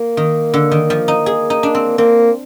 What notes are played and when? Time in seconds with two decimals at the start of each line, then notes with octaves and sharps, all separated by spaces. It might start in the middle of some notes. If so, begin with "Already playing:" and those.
Already playing: A#3
0.17 D#3
0.54 D3
0.71 D#3
0.90 F3
1.08 D#4
1.26 G#4
1.50 D#4
1.63 D4
1.75 C4
1.98 A#3 C4